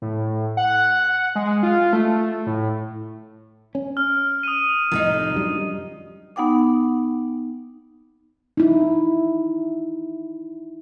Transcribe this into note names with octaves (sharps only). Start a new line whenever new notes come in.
A2
F#5
G#3
F4
A3
A2
C#4
F6
D#6 D#7
C2 F2 A2 D#3 F3 D#4
F#2 G3 D4
B3 D#4 F#5 G5 D6
D#4 E4